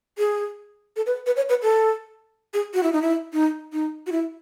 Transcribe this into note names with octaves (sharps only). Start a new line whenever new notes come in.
G#4
A4
B4
B4
C#5
B4
A4
G#4
F#4
E4
D#4
E4
D#4
D#4
F#4
E4